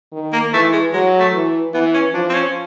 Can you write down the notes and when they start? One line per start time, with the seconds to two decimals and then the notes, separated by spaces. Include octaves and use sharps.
0.12 D#3
0.33 A#3
0.53 E3 A3
0.72 G#3
0.93 F#3 G#3
1.19 A3
1.33 E3
1.74 E3 B3
1.94 C#4
2.14 F3 D4
2.29 C4
2.34 C#4